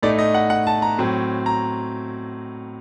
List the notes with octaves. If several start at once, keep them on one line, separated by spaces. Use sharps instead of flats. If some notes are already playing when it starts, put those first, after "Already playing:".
A2 A3 D#4 D5
D#5
F#5
F#5
A5
A#5
A2 F#3 C4
A#5